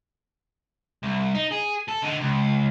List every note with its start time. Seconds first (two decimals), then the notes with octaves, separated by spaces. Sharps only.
1.03 C2
1.34 D#4
1.51 G#4
1.88 A4
2.02 D3 D#4
2.20 C#2